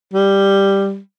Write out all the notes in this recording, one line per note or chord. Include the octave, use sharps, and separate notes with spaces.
G3